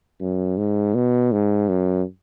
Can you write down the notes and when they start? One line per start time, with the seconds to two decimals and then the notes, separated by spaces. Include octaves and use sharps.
0.21 F#2
0.58 G#2
0.95 B2
1.32 G#2
1.69 F#2